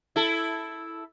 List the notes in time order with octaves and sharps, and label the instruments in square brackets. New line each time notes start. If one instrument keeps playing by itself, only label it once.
[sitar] E4 A4